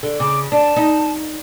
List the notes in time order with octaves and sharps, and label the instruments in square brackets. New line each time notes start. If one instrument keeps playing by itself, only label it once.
[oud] D3
[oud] C#3 [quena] D6
[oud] D4 [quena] A5
[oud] D#4